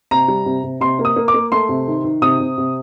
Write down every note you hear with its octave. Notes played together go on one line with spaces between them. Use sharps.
C3 A#5
G3
C3
C3
C3 C6
A#3
D#6
A#3
D6
A#3
A3 C6
C3
D#3
D#3
C3 D#6
C3
C3